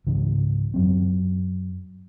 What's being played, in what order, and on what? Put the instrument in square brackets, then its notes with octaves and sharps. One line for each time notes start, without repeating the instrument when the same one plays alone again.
[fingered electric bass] C#2 G#2 C#3 E3
F#2 F#3 C4